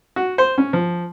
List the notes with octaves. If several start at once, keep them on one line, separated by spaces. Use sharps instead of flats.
F#4
C5
C#4
F3